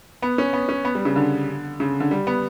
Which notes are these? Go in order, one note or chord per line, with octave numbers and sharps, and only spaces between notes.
B3
C#4
B3
C#4
B3
G3
C#3
D3
C#3
D3
G3
B3